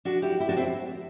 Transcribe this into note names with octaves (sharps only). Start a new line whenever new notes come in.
D4 F#4
E4 G4
E4 G4
D4 F#4
C4 E4